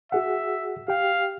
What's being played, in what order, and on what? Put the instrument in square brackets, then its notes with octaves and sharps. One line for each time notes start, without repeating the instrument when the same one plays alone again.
[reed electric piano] F#4 G#4 F#5 [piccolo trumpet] E5
[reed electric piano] G4 G5 [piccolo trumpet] F5